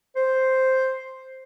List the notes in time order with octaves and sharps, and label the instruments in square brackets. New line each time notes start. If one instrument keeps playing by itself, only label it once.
[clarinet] C5